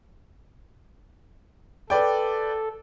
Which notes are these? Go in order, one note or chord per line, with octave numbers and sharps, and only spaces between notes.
A4 B4 D5 G5